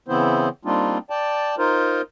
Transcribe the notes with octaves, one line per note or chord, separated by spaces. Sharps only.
C#3 E3 B3 C4 E4 C5
G3 A#3 C4 D4 D#4 F4
D5 G5 A5
D#4 F4 A#4 C5